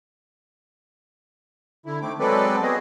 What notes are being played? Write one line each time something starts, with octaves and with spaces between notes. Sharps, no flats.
D3 E4
D#3 A3 C4 D6
F#3 G#3 C4 A4 B4 D5
B3 C4 F#4 G#4 D#5